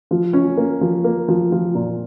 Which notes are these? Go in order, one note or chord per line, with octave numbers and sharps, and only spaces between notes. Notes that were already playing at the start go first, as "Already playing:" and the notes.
F3
C#4
A#3
F3
A#3
F3
F3
A#2